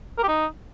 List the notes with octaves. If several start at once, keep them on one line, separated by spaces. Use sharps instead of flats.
A#4
G4
D#4